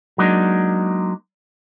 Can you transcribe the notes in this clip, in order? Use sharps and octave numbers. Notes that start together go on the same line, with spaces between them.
F#3 G#3 A#3 D4 D#4